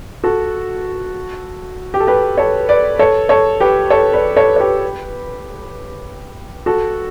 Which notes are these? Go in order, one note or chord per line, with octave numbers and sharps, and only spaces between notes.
F#4 A4
G4
A4
G4 B4
A4 C#5
B4 D5
A4 C#5
A4 C#5
G4 B4
A4 C#5
B4 D5
A4 C#5
C#5
G4 B4
F#4 A4